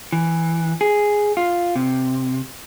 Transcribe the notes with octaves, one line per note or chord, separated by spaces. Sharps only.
E3
G#4
F4
C3